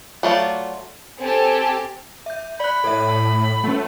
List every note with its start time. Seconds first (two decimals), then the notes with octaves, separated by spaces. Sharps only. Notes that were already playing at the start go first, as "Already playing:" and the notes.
0.23 F#3 A3 F4 D5
1.21 C4 G4 A4 G#5 A5
2.26 E5 G6
2.60 D5 B5 F#6
2.84 A2 A4 C#5 E5
3.64 G3 A3 C#4